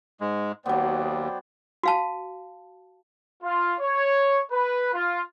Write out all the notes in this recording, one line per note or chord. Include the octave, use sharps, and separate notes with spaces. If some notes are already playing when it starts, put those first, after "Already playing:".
G#2 G#3
D#2 F#3 B3 C5 D5 G5
F#4 F5 A5
F4
C#5
B4
F4